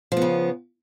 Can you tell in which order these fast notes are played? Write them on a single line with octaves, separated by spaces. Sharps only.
F3 B3 C#3